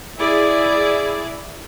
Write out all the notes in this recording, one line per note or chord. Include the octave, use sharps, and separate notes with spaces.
E4 G#4 D5